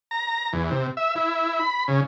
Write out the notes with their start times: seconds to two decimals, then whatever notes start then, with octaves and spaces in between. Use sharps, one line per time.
0.11 A#5
0.53 E2
0.71 C3
0.97 E5
1.16 E4
1.60 B5
1.88 C#3